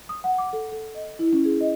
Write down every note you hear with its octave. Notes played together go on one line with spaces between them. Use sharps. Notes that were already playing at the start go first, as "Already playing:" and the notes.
D#6
F#5
D6
A4
A4
D#5
E4
C#4
G#4
D#5